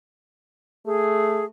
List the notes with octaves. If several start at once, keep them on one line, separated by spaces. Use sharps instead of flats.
A3 G#4